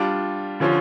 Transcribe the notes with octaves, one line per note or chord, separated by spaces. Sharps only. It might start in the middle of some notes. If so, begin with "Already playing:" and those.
Already playing: G3 D4 F4
D3 F3 C#4 F4